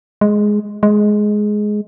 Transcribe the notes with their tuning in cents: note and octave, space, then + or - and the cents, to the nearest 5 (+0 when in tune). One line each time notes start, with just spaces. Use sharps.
G#3 +5
G#3 +10